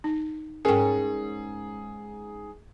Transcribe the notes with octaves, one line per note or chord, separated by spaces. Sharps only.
D#4
G#2 C#4 G#4 A#4 G5